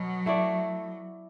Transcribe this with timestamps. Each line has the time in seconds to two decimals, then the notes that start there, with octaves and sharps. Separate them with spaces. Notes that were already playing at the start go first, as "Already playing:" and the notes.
Already playing: B2 F#3 B3
0.26 A3 E4 D5